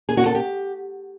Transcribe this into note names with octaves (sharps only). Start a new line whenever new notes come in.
G#4
F#4
A4
G4